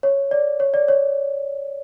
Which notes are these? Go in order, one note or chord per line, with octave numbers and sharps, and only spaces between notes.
C#5
D5
C#5
D5
C#5